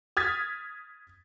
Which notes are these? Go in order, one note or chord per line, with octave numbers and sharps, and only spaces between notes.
D#6 F6 G#6 A6 B6